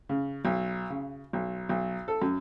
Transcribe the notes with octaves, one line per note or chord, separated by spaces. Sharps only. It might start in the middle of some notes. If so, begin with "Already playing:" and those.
C#3
B1
C#3
B1
B1
A4
F#2